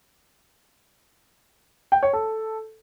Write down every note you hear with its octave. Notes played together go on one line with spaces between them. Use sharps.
G5
C#5
A4